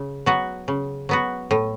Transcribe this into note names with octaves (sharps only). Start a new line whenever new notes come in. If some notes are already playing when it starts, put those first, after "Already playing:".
Already playing: C#3
F#3 B3 F#4
C#3
F#3 B3 F#4
A2